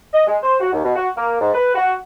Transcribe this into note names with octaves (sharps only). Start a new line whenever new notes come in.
D#5
G#3
C5
F#4
D#2
B2
F#4
A#3
G#2
B4
F#4